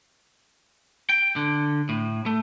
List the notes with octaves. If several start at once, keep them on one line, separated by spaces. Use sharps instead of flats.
G5
D3
A2
A3